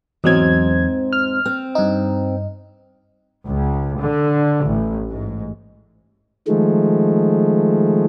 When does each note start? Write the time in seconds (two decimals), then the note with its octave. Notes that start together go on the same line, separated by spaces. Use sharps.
0.24 E2 G#2 F#3 C4 G#6
1.13 F6
1.46 C4
1.75 G2 D#4
3.48 C#2
4.03 D3
4.65 A1
5.12 G#2
6.48 D#3 F3 G#3 A3